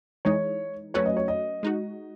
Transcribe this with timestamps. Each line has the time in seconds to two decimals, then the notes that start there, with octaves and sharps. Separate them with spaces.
0.25 E3 G#3 D#4 C#5
0.94 F#3 A3 C#4 F#4 B4 C#5
1.05 D#5
1.17 C#5
1.28 D#5
1.63 G#3 D#4 F#4